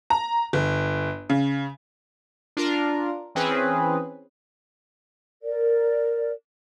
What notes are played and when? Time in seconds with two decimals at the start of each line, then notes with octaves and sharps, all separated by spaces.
0.10 A#5
0.53 G1
1.30 C#3
2.57 D4 F4 A#4
3.35 E3 C4 C#4 G#4 B4
5.42 A#4 D5